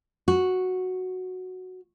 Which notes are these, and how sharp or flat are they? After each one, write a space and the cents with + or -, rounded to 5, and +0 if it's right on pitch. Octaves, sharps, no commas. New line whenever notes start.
F#4 -5